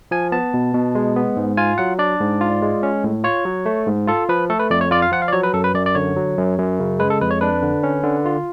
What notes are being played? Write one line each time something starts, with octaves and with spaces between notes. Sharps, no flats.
F3 G#5
B3 A5
B2
B2
G#3
B3
G#2
F4 G#5
F#3 F#5
D4 D5
G#2
F4
G#3
C#4
A2
F4 C#5
F#3
A3
G#2
F4 A4
F3 B4
A3 A4
B4
F2 D5
C#5
F4 D5
F5
F3 F#5
F5
D5
F#3 C#5
B4
F#2 A4
B4
F#2 D5
D5
D3 C#5
F#3
F#2
F#2
C#3
G#3 B4
A4
F2 B4
C#5
D4 B4
D3
C#4
D3
F4